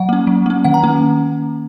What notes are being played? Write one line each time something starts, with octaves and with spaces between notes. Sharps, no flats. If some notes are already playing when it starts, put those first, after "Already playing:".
Already playing: F#3 F#5
A#3 C#4
F#3
A#3 C#4
D#3 F#5
A#5
A#3 C#4